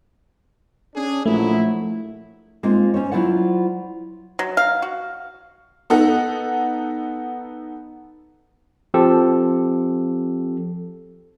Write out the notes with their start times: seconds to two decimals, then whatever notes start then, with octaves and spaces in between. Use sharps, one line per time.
0.95 C#4 D4 G#4
1.26 A#1 F#3 A3 E4
2.63 G#3 A#3 C4 D#4 F4
2.94 C#4 C5 C#5
3.11 F#3 E4 F4 C5 D5 F#5
4.39 F#3
4.57 F5
4.82 F#4
5.90 B3 D#4 A4 F#5
8.94 F3 C4 G4 A4